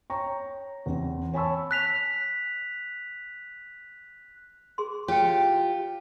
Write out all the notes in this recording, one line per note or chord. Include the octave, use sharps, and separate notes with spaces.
C#5 G5 A#5 C#6
E2 C4
C#5 G#5 A5 B5 C#6 E6
F#6 B6 F7
G#4 C6
F4 G4 C#5 G5